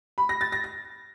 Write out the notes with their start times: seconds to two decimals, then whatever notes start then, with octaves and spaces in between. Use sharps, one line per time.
0.18 B5
0.29 A#6
0.41 A6
0.52 A#6
0.64 A#6